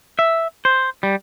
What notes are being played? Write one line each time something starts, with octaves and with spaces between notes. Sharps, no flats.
E5
C5
G3